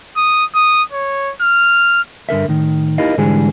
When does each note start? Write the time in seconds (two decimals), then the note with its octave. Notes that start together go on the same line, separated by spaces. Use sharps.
0.17 D#6
0.55 D#6
0.92 C#5
1.41 F6
2.29 G2 D3 A#4 E5
2.48 A2 D#3
2.98 D#4 E4 G4 A#4 D#5 F5
3.18 G#2 D3 E3 G3 G#3 G#4